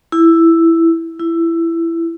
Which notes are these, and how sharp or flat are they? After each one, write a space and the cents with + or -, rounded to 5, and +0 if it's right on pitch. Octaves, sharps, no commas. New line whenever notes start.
E4 +5
E4 +15